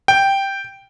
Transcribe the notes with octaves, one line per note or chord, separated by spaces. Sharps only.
G5